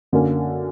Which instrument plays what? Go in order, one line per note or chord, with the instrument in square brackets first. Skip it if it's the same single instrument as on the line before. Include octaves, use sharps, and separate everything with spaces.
[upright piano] F#2 D3 A#3 C#4